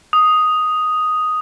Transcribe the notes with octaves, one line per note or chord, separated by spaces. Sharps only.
D#6